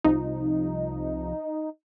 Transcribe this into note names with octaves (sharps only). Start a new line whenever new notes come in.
C2 C3 F3 D#4